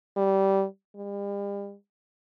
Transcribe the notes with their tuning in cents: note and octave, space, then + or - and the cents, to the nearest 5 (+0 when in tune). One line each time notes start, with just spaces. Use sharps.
G3 -15
G3 +40